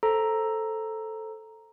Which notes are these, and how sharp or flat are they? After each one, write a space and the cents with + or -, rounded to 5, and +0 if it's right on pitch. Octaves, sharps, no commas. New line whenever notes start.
A4 +0 C5 +10 A#5 +0